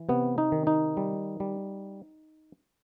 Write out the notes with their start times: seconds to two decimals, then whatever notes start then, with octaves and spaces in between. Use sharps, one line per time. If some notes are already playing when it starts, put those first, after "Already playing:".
Already playing: E3
0.09 C3 B3
0.38 D#4
0.52 D#3
0.67 D#4
0.97 G3
1.40 G3